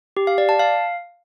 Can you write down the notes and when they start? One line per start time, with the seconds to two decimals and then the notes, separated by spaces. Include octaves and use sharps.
0.17 G4
0.27 F5
0.38 D5
0.49 A5
0.59 F5